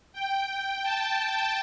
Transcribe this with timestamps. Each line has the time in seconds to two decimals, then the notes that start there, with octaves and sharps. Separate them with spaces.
0.13 G5
0.83 A5
1.17 A5